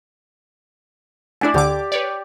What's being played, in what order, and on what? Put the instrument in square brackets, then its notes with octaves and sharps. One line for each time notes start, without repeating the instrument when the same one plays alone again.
[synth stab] A3 D4 E4 [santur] D5 G#5
[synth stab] D2 D3 D6 [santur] G4
[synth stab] B4 C#5 D5